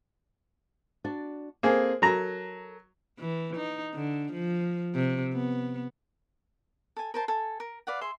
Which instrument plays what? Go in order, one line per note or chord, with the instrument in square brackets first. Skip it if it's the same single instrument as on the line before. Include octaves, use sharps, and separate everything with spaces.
[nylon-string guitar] D4 F#4 D5
[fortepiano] A#3 G#4 [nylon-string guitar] C4 A4
[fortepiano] F#3 A#5 [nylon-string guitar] A4 A#4
[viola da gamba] E3
D#4
D3
F3
C3
B3
[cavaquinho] A4 G#5
A#4 C5 A5
A4 G#5
A#4
B4 D5 F5 F#5
G#4 E5 C6